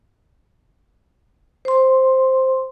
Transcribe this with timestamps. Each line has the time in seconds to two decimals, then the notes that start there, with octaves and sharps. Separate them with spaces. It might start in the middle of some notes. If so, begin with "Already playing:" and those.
1.65 C5 C6